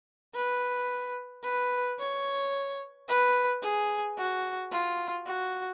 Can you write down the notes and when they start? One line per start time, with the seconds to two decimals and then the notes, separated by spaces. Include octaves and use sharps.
0.35 B4
1.44 B4
1.99 C#5
3.08 B4
3.62 G#4
4.18 F#4
4.71 F4
5.26 F#4